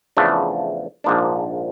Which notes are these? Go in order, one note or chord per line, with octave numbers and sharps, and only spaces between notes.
E2 C#3 F3 A3 D4
A#1 G#2 F3 A#3 D4